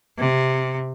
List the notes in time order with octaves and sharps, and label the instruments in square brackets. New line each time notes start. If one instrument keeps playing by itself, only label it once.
[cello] C3